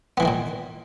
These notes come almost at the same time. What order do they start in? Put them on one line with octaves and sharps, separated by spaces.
B3 E3 A#3 D#3 A#2